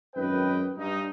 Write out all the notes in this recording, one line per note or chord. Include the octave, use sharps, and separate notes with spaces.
G#1 F#2 B4 D#5 G5
G2 D#4